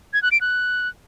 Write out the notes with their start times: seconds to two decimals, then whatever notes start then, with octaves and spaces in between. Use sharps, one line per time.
0.13 G#6
0.23 F#6
0.32 D7
0.41 F#6